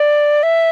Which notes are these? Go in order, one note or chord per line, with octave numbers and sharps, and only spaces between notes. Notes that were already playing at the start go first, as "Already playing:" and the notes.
Already playing: D5
E5